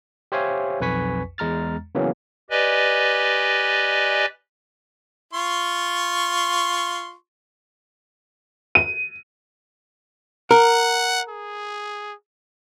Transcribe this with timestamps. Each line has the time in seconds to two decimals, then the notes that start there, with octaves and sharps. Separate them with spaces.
0.32 G4 C5 C#5 E5 F5 G#5
0.81 B1 F2 B4 G#5 C#6 B6
1.38 E2 G#3 A#5 F6 A6
1.95 C#3 E3 F#3 A#3 B3 C#4
2.50 G4 B4 D5 D#5 G#5
5.34 F4 C6 C#6
8.75 D#7
10.51 A#4 F#5
11.29 G#4